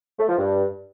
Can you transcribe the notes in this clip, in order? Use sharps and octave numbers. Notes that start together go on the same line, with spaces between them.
A3
F3
G2